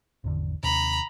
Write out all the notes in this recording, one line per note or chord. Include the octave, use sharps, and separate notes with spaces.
G#1 E2 D3
D#2 C3 A#5 B5